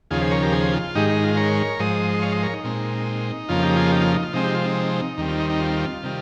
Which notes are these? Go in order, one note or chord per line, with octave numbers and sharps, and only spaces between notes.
D#2 C#3 F3 F4 G#4
G#4 C5
A#4 C#5
G4 A#4
G#4 C5
F4
G#2 D#3 G#3 D#4 G4
D#4
F4
A#4 C#5
G#2 F3 G#3 C5 D#5
C#5 F5
C5 D#5
A#4 C#5
D#4
A#2 G#3 C4
F2 C#3 F3 A#3 F4
D#4 G4
F4 G#4
D#4 G4
F4
D#4
F4
C3 F3 G#3 C4 D#4
D#4 G4
F4
D#4
D#2 D#3 G3 C4
F4
D#4
D#4
F4
C3 D#3 G3